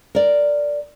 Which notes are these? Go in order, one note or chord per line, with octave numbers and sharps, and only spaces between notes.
A#4 D5